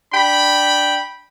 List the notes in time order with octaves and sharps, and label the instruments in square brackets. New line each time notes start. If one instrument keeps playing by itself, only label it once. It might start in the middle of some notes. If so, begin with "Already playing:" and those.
[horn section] D4 G5 B5